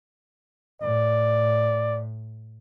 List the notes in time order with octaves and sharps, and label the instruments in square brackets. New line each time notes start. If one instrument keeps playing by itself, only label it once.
[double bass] A2 [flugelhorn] D5